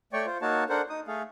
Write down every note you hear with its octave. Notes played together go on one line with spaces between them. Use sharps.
A3 C#5 D5 G5 C#6
F4 C5
A#3 D#4 F#4 C#5 A5
D4 A4 A#4 C5 F#5
D#4 D#6
A3 G#4 A4 F5